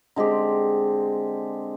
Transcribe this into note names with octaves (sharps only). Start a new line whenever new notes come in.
D3 G#3 C4 G4